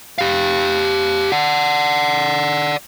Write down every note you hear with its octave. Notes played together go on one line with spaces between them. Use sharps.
G4 F5
D5 F#5